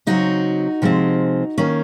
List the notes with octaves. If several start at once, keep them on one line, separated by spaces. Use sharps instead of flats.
C#3 F#3 C4 D#4 F#4
C3 F3 G#3 C4
D#3 A#3 C#4